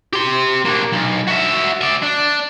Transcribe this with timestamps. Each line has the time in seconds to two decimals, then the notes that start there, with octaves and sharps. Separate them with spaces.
0.13 G4 C6
0.65 A#3 D4
0.93 B1
1.28 F#4 E5
1.81 D5 E5
2.02 D4